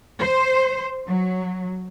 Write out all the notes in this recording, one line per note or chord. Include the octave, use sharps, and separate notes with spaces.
C5
F#3